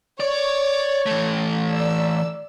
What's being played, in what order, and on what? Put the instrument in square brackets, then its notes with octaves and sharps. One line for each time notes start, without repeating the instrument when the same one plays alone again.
[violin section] C#5 [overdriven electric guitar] D5
[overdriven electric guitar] E3 A3
[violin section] D5 E6